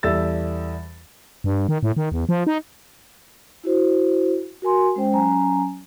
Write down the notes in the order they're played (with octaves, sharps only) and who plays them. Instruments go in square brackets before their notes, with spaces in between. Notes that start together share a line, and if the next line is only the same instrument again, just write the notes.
[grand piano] E2 G3 A4 E5 E6 A6
[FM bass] G2
D#3
A2
D#3
E2
F3
D#4
[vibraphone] E4 F#4 C5
F#4 A#4 G#5 C6
G#3 C#4 C5 G5
F#3 C#4 G#5 A#5